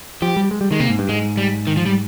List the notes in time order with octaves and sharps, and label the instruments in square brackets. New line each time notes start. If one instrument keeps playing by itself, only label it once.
[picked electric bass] F3 [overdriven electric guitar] G4
[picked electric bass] G3
G#3
G3
[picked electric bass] D#3 [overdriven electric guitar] G#3
[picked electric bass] C3 [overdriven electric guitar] A#3
[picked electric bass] G#2
G2
[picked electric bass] G#2 [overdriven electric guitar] G#3
[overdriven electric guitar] G3
D#3
F3
G3